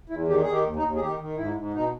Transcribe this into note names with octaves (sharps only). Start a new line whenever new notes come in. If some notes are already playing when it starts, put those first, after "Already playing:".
E2 E4
D#3 G4
D#3 G#4
G4
D#2
D#4
D#2
G#4
D#3 G4
D#3
G#2 E4
G#2
B2 D#4